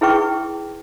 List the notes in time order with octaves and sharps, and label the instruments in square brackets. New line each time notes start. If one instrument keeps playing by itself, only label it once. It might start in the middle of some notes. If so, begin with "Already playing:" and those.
[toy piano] E4 G#4 B4 G5 C#6